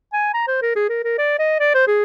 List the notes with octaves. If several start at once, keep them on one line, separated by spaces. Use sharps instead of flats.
G#5
A#5
C5
A#4
G#4
A#4
A#4
D5
D#5
D5
C5
G#4